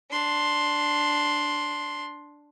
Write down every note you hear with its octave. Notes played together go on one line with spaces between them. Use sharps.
D4 C6